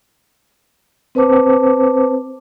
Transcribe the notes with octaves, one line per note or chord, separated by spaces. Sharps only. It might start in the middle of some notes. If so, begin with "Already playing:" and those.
C4 B4 C5 A5 D6